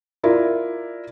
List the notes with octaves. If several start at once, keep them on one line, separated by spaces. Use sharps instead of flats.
E4 F4 A#4 D5